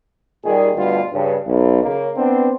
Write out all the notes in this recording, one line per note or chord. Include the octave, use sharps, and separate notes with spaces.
A#2 D#3 G3 G#4
D2 G2 B2 D3 G3 F4
G2 C#3
B1
C#3 A#3
B3 C4 D4